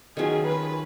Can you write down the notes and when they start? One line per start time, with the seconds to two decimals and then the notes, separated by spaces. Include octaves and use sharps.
0.17 D#3 F#3 C#4 F4 G#4
0.47 B4